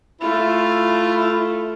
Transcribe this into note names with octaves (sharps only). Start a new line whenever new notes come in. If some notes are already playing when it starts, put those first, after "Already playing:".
A3 E4 F4